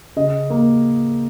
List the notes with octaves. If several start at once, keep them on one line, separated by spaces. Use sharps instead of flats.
C#3 D#5
A#3